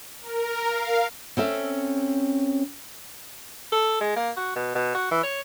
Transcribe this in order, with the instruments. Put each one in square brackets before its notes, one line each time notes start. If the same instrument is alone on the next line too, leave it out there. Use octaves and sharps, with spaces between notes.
[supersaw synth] A#4
F5
[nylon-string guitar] C4 C#4 A4 E5
[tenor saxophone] A4
G#3
A#3
F#4
B2
B2
F#4
E3
C#5